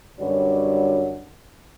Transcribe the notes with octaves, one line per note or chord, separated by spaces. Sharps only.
F#2 D3 G3 F#4 B4 C#5